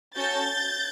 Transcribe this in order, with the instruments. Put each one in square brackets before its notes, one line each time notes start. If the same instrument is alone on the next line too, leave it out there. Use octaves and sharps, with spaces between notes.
[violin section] C#4 F#4 A4 G6 A6